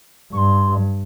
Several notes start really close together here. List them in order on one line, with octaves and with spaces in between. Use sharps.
G2 C#6 C6